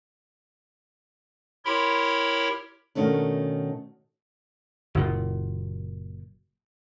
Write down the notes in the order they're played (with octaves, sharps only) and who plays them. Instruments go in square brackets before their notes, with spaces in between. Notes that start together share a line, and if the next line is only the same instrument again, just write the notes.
[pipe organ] E4 G4 A#4 C#5 B5 C6
[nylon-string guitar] B2 D#3 A3 C#4 D4
[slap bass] F#1 A#2